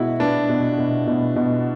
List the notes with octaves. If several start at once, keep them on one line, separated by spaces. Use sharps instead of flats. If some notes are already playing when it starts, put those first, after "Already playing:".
Already playing: B2 G#3 E4 F#4
B3 D4
B2
B2
B2
B2